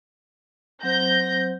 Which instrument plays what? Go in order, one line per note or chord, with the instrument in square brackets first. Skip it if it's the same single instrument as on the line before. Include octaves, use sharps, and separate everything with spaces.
[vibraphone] F#3 C4 C5 [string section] G6 A#6